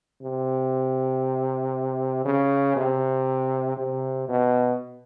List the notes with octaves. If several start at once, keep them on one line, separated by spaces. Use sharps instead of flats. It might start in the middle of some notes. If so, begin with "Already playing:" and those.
C3
C#3
C3
C3
B2